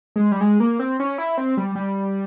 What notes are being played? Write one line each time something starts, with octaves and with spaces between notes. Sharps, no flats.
G#3
G3
G#3
A#3
C4
C#4
E4
C4
G3
G3